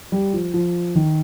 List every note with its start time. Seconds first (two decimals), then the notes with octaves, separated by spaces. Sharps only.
0.12 G3
0.33 F3
0.54 F3
0.95 D#3